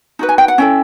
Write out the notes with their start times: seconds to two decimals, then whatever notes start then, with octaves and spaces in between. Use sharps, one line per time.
0.19 D#4 F#4 B4
0.29 G#5
0.38 G5
0.48 F#5
0.58 C#4 E4 A4 G5